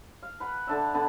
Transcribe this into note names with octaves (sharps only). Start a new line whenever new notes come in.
F5
B4 F#5 B5
D3 D4 E5
D3 B3 D4